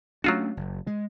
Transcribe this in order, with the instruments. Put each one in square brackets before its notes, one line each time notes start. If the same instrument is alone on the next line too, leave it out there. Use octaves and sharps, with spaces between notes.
[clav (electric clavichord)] F#3 F4 F#4 [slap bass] A3 C#4 D4
[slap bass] F#1
G#3